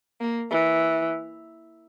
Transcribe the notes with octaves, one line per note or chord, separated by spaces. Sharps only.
A#3
E3